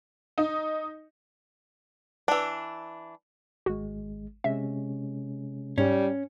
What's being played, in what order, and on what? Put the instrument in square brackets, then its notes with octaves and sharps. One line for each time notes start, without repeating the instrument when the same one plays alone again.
[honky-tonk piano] D#4
[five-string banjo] E3 D4
[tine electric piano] G#1 G#3 [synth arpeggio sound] F#4
[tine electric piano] C3 G#3 C#4 [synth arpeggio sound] E5
[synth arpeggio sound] G#2 [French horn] G3 [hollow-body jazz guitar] C#4